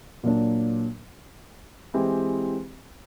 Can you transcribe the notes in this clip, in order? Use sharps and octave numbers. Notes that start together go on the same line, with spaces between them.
A#2 F#3 A#3 D4
E3 G#3 C4 E4 G4